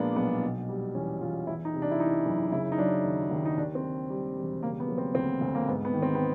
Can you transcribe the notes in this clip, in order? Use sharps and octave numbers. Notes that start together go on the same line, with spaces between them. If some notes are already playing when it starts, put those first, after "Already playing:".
Already playing: A#2 F3 G#3 A#3 B3 D4
B1 B3
B2
G3
E2 C#4
E2 F4
E2 E4
D#4
C3
D4
E4
E3 D#4
F#1
C#3 E4
D#4
F#3 D4
D#2
D#2
D#4
D#2 D4
C4
D#3
G3
E1
C#3 A#3
B3
F#3
C4
D2 C4
D2
A#3
G#2 B3
B3
D#3
C4
B3